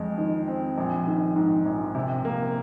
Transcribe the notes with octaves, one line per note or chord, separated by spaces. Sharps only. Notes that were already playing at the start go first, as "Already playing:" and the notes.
Already playing: F2 G#3
D#3
C4
A#1
D#3
G#2
A#1
C3
A#3